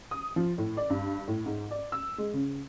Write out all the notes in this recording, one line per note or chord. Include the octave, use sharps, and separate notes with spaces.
D#6
F3
A2
D5
G2
A2
G#2
D5
E6
G#3
C#3